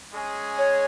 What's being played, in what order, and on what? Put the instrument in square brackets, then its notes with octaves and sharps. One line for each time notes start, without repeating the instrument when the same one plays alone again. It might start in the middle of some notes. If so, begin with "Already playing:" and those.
[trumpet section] G#3 C#4 G#4
[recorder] C#5